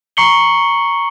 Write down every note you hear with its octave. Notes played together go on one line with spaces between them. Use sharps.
A#5 C#6 C7 C#7 F#7 G7